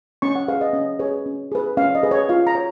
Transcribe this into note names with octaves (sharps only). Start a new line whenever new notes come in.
C#4 C#6
F#5
G#4 B4 F5
D#5
C#4 D#5
G#4 B4 C#5
C#4
G#4 B4
C#4 F5
D#5
G#4 B4
C#5
F4 F5
A#5
C#5